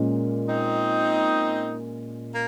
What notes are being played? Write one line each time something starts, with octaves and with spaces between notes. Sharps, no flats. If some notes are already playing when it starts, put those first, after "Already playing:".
Already playing: A#2 G#3 C#4
C4 D#4
A#3